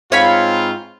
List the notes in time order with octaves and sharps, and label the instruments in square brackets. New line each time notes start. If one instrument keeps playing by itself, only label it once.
[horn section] G#2 C4 F4 [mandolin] C#5 F5 B5